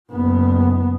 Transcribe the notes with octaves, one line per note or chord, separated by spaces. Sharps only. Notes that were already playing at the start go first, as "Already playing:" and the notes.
F#1 B3